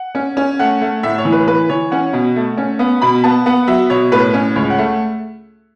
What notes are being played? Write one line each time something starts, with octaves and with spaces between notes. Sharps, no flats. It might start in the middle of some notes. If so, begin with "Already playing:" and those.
Already playing: F#5
C#4
C#4
A3 F#5
A3
A2 E5
C#5
E3
B4
E3 B4
E3 C#5
C#4 F#5
B2
A3
C#4
B3
B2 B5
B3 A5
B3 F#5
F#3 E5
B2 C#5
A2 B4
C#4
C#2 C#5
F#5
A3